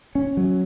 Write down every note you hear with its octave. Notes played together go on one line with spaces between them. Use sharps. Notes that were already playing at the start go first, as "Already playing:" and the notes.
C#4
F#3